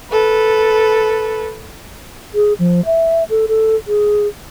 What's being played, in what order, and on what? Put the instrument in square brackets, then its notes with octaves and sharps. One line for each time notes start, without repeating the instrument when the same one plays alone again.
[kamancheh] A4 B4
[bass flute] G#4
F3
E5
A4
A4
G#4